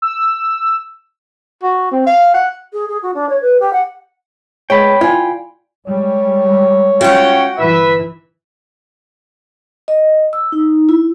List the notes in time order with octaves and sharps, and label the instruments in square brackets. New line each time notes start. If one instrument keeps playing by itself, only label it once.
[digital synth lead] E6
[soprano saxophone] F#4
C4
F5
F#5
[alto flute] G#4
G#4
F#4
D4
C#5
B4
G4
F#5
[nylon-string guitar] G#3 B3 [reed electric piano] C#5 [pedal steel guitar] G5 B5
[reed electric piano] E4 [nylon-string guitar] F4 [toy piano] D5 G#5
[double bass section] G3 G#3 [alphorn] C#5
[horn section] C#4 F4 G5 [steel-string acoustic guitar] F#4 F#5
[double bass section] G1 E3 [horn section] B4 E5
[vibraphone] D#5
E6
D#4
E4